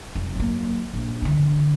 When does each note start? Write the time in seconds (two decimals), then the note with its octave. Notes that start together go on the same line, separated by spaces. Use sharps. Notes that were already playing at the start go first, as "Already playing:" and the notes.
0.15 F1
0.35 F#3 A#3
0.94 A#1
1.22 D3 E3